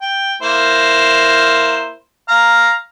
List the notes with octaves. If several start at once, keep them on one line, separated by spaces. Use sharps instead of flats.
G5
A#3 E4 C5
F5 A#5